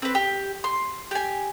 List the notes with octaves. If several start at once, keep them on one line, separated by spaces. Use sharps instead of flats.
C4 B4
G4
C6
G4 G#5